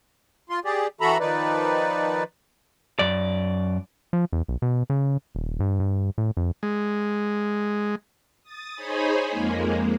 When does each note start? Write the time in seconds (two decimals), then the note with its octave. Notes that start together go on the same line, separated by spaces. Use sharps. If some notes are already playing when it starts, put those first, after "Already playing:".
0.50 F4 C6
0.65 G4 G#4 D5
1.01 E3 F#4 A4 E5 A#5 B5
1.20 D#3 F3 D#4 B4 D5
2.99 F#2 D5
4.13 F3
4.33 E2
4.48 B1
4.62 B2
4.90 C#3
5.35 D#1
5.60 G2
5.80 G2
6.18 A2
6.37 F2
6.63 G#3
8.43 D#6 A6
8.76 D#4 G#4 C5 C#5 G#5 B5
9.31 F2 G#3 A#3